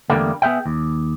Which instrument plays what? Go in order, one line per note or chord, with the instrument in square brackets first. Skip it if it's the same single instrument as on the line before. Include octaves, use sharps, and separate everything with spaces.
[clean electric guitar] E2 G2 D3 G3 A3 A#3
B3 G#4 E5 G5
D#2